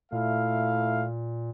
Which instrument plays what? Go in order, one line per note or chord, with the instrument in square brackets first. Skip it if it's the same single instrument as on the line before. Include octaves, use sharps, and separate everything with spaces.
[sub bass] A#2 [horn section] A3 E4 F5